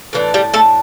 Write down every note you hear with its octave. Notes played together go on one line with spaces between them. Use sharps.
A2 E3 A#3 D4
G3 G4
A3 A4